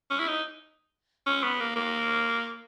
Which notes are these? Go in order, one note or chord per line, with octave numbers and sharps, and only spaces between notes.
C#4
E4
D#4
C#4
B3
A#3
A#3